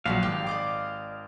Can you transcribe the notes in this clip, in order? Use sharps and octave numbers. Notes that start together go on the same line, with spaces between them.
A#1 F#3 B3 E4 F#4 F5
G#1 G4
D5 D#5 D6